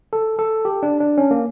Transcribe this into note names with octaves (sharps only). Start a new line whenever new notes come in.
A4
A4
G4
D4
D4
C#4
A#3